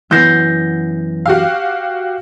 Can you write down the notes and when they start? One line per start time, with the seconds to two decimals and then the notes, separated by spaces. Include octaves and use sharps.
0.11 F#2 E3 B3 G6 A#6 C7
1.26 F#4 G4 F5